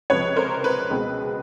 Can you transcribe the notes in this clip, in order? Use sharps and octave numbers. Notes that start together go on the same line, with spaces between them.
C#2 C3 F3 B4 C#5
A#4 C5
B4
C#2 B2 G#3 C4